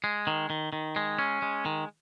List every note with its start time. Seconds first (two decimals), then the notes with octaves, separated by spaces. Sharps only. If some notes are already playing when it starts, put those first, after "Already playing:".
0.04 G#3
0.27 D#3
0.50 D#3
0.73 D#3
0.96 G#3
1.19 C#4
1.42 G#3
1.65 D#3